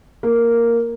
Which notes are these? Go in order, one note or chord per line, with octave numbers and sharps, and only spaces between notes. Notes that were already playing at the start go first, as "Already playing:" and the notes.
A#3